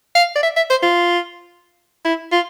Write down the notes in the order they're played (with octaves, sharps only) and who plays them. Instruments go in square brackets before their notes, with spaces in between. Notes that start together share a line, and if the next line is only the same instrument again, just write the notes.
[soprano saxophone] F5
D5
E5
E5
C5
F4
E4
F4